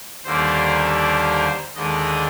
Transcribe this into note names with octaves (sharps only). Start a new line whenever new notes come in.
D#2 D3 G3 A#3 D4 C5
C5
D#2 D3 G#3 D4 D#5